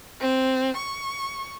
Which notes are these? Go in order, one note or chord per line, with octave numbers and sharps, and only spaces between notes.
C4
C#6